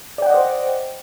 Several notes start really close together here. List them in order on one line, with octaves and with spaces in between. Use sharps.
D5 G5 F#5 D#5 C5